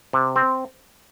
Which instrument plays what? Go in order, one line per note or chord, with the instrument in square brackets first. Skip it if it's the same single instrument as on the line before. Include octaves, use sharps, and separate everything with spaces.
[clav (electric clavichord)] C3
C4